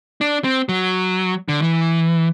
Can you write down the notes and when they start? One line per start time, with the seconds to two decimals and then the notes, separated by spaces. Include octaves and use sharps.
0.21 D4
0.44 C4
0.69 F#3
1.48 D3
1.62 E3